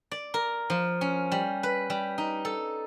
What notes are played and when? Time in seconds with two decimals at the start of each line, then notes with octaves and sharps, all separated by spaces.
0.11 D5
0.34 A#4
0.70 F3
1.01 C#4
1.32 G3
1.63 B4
1.90 G3
2.18 D#4
2.45 A4